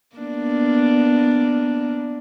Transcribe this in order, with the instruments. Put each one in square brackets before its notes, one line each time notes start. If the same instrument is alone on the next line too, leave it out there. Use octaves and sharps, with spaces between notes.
[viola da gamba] A#3 B3 D4